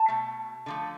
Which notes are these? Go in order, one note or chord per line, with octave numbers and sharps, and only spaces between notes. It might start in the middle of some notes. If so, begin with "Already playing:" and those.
Already playing: A5
B2 A3
D3 F3 A3